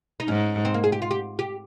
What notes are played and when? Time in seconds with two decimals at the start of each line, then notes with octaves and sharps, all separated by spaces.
0.20 D#4
0.28 G#2 C#4
0.65 C4
0.74 A#3
0.84 G#4
0.92 G4
1.02 F4
1.11 G4
1.39 G4